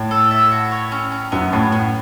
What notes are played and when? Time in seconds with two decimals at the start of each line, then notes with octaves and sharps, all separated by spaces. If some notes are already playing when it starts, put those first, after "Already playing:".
Already playing: A2
0.11 A4
0.31 E5
0.51 F#4
0.72 C#5
0.92 C#4
1.12 C#4
1.32 F#2 B3
1.53 A2 B3
1.72 B3